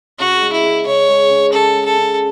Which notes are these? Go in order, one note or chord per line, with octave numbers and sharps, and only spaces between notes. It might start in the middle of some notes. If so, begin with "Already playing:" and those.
C#3 F#4
G#3
E4
C#3
C#3 C#5
G#3
C#3
C#3 A4
G#3
A4
C#3